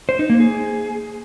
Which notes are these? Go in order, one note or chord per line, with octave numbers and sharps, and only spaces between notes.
C5
D#4
A#3
G#4